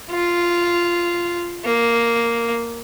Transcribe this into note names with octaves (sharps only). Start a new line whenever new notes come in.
F4
A#3